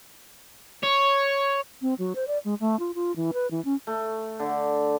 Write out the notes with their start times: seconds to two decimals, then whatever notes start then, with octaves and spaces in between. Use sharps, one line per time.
0.83 C#5
1.82 C4
1.98 F#3
2.15 C5
2.27 D5
2.45 G#3
2.60 A3
2.79 F4
2.95 F4
3.16 E3
3.33 B4
3.51 E3
3.65 C#4
3.87 A3
4.40 D3